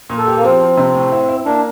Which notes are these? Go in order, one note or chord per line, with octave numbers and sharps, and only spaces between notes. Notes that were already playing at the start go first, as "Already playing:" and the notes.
A#2
A4
G4
A#3
F3 C4
F3
C3
A2
E4
E4
A#3 D4